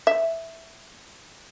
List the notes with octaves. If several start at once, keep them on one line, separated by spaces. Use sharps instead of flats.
E5